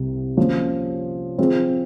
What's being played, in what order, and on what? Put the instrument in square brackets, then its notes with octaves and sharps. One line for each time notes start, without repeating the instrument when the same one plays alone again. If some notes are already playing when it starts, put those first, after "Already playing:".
Already playing: [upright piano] C2 C3
F3 A#3 C#4
F3 C4 F4 G#4